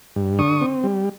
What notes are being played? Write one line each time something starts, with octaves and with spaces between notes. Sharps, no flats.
G2
D3 C#6 D#6
C4
G3